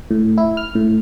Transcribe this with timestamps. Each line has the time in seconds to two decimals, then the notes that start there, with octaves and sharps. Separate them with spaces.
0.11 A2
0.38 E4
0.57 F6
0.75 A2